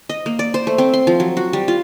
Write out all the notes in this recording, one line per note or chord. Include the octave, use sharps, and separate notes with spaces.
D#5
A#3
D5
C5
A3
C4
C6
F3
F#3
F#4
G3
F4